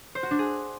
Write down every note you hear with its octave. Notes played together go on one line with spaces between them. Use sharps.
C5
F#4
D4
G#4